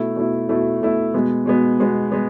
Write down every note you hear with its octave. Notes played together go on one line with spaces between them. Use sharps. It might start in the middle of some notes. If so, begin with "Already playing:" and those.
Already playing: B2 A3 E4
B2 A3 E4
B2 A3 E4
B2 A3 E4
B2 G#3 B3
B2 G#3 B3
B2 G#3 B3
G#3 B3